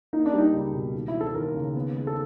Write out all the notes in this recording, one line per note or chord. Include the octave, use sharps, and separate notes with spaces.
A#3 D#4
D4
G3 D#4
C#2
B2
D#2
E4
E3
A4
D#2 A#4
C#3
B3
G#3
A4